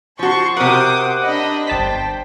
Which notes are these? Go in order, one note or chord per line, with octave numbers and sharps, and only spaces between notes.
F3 F#4 A5 C6 C#6
C3 A#4 C5 F#5 D6 D#6
D4 D#5 B5
G1 C5 G5 A5 B6